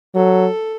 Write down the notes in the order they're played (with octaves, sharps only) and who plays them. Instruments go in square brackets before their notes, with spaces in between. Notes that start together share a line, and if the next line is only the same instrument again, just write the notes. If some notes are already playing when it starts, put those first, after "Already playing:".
[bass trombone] F#3 [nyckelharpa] A4